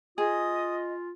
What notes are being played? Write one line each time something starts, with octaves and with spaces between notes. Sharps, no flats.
F4 G#4 D#5 D#6